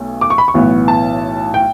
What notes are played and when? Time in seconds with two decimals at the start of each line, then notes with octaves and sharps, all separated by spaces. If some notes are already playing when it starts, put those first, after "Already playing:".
Already playing: B1 B2 A3
0.21 D6
0.30 C#6
0.38 B5
0.48 C#6
0.54 B1 A2 E3 B3
0.88 A5
1.54 G5